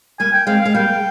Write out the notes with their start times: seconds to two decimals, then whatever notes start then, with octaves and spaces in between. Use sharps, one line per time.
0.20 G3 A#3 G#5
0.33 G5
0.47 G#3 C4 F5
0.61 G#3 F5
0.74 G3 A#3 G5